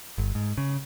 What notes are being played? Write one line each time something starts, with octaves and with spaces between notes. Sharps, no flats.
G1
G#2
C#3